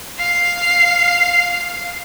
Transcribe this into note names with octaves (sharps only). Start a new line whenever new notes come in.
F5 C7